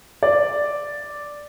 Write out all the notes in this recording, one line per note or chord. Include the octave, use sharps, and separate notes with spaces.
D5